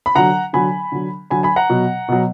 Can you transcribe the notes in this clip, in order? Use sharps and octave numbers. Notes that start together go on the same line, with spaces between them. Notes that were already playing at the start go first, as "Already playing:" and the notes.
B5
D3 F#3 F#5 A#5
D3 F#3 G#5 B5
D3 F#3
D3 F#3 G#5 B5
G#5 B5
F#5 A#5
B2 F#3
B2 F#3